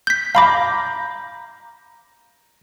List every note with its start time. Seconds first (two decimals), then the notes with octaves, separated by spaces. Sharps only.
0.07 G6 B6
0.35 F5 A#5 B5 D6 G6 A#6